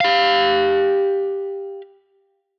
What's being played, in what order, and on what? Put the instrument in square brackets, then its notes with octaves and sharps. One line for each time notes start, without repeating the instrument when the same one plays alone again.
[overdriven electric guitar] G4 F5